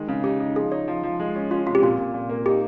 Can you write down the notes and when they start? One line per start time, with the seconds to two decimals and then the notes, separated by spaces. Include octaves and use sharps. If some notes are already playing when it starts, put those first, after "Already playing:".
Already playing: D#3 G#3
0.08 C#3
0.24 D#4 G4
0.40 D#4
0.56 F3 G#4
0.72 D#4 C#5
0.88 F3
1.03 F3
1.20 G#3
1.35 C#4
1.51 C#4 F4
1.66 C3 F4
1.75 G4
1.82 A#2 F4
1.98 A#2
2.14 A#2
2.29 A#3
2.46 D#4 G4